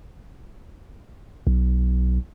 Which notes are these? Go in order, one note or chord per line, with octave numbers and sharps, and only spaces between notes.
B1